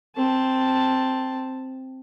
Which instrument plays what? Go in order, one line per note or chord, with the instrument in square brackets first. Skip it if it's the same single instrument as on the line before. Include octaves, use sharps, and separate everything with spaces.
[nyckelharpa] C4 A5